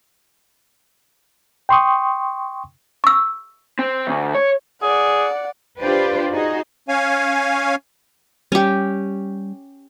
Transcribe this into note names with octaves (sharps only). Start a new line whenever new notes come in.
G5 C6 C#6 D#6
C#6 E6
C4
D2
C#5
G#4 D5 F#5
D4 F4 G4 B4 C5 D5
D#4 F#4 G#4 D#5
C#4 C#5 F5 G#5
G3 C#4 G4